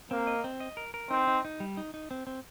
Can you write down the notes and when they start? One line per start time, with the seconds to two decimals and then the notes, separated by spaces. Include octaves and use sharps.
0.11 A#3 C4
0.27 D#5
0.44 C4
0.60 D#5
0.77 A#4
0.94 A#4
1.10 C4 D#4
1.27 D#4
1.45 D#4
1.60 G3
1.77 D#4
1.94 D#4
2.11 C4
2.27 C4